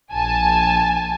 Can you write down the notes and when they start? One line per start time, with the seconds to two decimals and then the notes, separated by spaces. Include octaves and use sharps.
0.11 A#1 G#5 A5